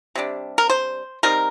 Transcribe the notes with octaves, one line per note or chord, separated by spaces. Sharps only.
C3 G3 D4
A#4
C5
G3 C4 D#4 A#4